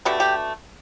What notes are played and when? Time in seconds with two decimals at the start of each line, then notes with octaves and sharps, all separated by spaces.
0.05 B2 A3 D4 G4
0.20 G4